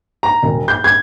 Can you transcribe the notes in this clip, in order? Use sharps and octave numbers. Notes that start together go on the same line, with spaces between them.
A#5
E1
G6
G#6